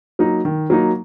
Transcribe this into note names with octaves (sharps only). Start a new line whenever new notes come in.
F#3 A#3 D#4
D#3
F#3 A#3 D#4